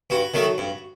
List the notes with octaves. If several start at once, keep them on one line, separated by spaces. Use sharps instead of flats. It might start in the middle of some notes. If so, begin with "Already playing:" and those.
G2 F#4
D#3 F#3 A3
G2